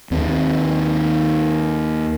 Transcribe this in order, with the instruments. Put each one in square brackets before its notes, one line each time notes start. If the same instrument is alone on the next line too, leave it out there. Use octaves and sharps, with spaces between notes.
[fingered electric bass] D#2 D#3 C4